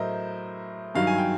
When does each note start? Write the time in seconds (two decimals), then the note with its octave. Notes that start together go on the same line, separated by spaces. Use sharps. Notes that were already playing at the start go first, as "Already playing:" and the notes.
Already playing: A2 F#3 A#4 C5 D#5 E5
0.95 G2 D#3 F#3 F5
1.07 G#5
1.18 G5